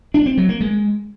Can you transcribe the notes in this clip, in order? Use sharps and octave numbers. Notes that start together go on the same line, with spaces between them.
D4
C4
F#3
A#3
G#3